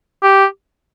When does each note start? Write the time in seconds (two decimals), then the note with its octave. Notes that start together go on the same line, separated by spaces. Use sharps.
0.23 G4